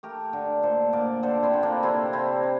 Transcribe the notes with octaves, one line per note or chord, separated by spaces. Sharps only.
A3 G4 A#4
D3
A#2 A4 C5
A#2 A#4 D5
D3 A4 C5
C4 E4
D3
A#3 D4
C3 C4 E4
C3 C4 E4
C4